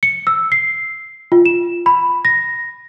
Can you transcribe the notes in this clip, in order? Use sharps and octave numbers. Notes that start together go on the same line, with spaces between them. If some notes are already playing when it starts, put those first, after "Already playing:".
C#7
E6
C7
F4
E7
B5
A#6